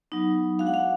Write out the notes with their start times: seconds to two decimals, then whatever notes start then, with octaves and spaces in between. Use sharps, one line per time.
0.12 F#3 B3 D#4
0.59 G#3 D4 F#4 F5
0.67 F#5
0.74 F5